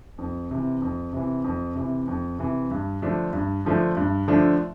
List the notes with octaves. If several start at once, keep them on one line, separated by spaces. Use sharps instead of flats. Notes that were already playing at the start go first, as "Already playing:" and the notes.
F2
C3 E3
F2
C3 E3
F2
C3 E3
F2
C3 E3
G2
D3 F3 A3 D4
G2
D3 F3 A3 D4
G2
D3 F3 A3 D4